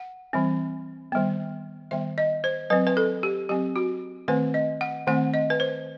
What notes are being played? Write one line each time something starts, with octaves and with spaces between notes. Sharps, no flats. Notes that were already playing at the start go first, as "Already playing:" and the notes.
Already playing: F#5
E3 G3 C4
D#3 G3 B3
D#3 G3 B3 E5
D#5
C5
F#3 C4 B4
B4
A4
G4
F#3 C4 G4
F#4
D#3 A3 C4 B4
D#5
F#5
D#3 A3 C4 F#5
D#5
B4
C5